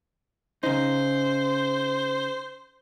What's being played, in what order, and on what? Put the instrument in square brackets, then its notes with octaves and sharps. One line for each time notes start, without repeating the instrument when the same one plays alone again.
[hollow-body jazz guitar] C#3 D#4 [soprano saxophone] C5